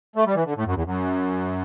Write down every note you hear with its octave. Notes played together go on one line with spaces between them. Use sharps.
A3
G3
E3
D3
A2
F#2
E2
F#2